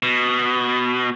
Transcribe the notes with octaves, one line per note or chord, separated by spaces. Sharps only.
B2